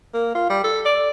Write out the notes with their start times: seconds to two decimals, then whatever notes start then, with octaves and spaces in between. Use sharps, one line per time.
0.14 A#3
0.35 F4
0.50 G3
0.64 A4
0.86 D5